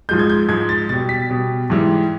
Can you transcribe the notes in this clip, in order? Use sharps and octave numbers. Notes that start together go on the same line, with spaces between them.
G#2 F3 G#3 G6
G#6
G6
G#2 F3 G#3 G#6
A6
B2 G3 A6
B6
B2 G3
G#2 E3 G3